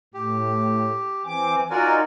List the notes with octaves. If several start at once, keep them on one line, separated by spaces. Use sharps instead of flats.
A2 G4
E3 C4 G#5 D6
D#4 F4 F#4 A#4 D5 G#5 A#5